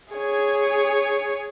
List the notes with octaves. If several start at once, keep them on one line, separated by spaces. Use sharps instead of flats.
G#4 C#5